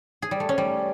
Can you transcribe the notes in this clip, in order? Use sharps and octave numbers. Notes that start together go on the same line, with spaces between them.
G#4
G3
A3
C#4
G3